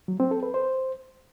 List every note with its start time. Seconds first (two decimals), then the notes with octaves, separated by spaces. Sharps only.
0.08 F#3
0.20 C4
0.31 A4
0.43 B4
0.54 C5